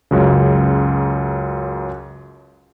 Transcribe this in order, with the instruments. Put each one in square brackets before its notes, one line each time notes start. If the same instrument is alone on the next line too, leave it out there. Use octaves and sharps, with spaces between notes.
[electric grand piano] C#2 F#2 C#3